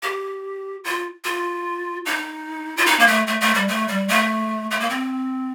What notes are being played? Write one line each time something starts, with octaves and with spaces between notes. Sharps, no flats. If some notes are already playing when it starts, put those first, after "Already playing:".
G4
F4
F4
D#4
F4
D#4
A#3
A3
A3
A3
G3
A3
G3
A3
A3
A#3
C4